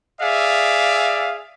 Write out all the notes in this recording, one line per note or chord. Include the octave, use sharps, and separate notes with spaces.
G#4 D5 E5 F5